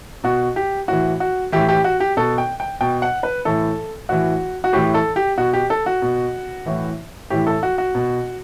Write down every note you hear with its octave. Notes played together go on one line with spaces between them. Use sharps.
B2 F#4
G4
A2 E3 F#4
F#4
A2 E3 G4
G4
F#4
G4
B2 A4
G5
G5
B2 G5
F#5
B4
A2 E3 A4
A2 E3 F#4
F#4
A2 E3 G4
A4
G4
B2 F#4
G4
A4
F#4
B2
A2 E3
A2 E3 G4
A4
F#4
F#4
B2